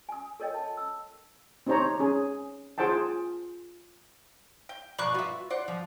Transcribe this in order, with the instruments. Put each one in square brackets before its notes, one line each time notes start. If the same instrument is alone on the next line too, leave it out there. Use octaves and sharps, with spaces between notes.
[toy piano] G#5 D#6
A4 A#4 C#5 D#5 G5
A5
E6
[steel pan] C4 D#4 G4 C5 C#5 A#5
C#4 G#4
F4 G#4 C5 F#5 G5 A5
[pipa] G5
[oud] B2 F3 [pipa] A#4 D5 [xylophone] B5 C#6 F#6
[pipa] B3 F4 [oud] F#4 E5
[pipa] C5 D5 F#5
[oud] F3